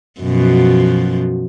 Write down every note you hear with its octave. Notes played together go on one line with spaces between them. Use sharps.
F#2 B2 F3